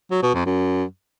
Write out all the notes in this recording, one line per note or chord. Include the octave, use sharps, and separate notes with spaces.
F#3
B2
F2
F#2